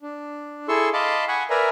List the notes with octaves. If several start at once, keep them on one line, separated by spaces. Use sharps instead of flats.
D4
E4 G#4 A4 C6 C#6 E6
D#5 F5 A5 B5 C6 D6
F#5 G#5 B5 C#6
A#4 B4 D5 E5 G#5 A#5